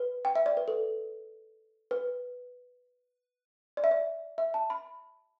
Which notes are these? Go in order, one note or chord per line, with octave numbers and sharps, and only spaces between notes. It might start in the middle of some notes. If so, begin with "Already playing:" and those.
Already playing: B4
G5
E5
D5
B4
A4
B4
D5
E5
D5
E5
A5
B5